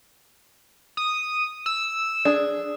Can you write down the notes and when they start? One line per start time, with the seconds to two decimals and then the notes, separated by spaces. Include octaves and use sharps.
0.97 D#6
1.66 E6
2.25 D4 G#4